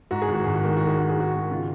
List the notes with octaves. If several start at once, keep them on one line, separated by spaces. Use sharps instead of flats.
G#2 F#4
G#4
G#1 F#4
G#1 G#4
F#4
D#3 G#4
D#3 F#4
G#4
D#3 F#4
G#4
D#3 F#4
G#1
C#3 F4